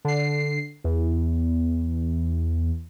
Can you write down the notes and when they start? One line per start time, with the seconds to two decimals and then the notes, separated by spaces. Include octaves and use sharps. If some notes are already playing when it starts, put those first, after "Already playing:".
0.05 D3 C7
0.84 E2